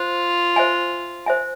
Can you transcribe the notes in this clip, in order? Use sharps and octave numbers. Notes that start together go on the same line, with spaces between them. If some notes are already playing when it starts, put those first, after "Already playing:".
Already playing: F4 C5
C5 E5 G#5
C5 E5 G#5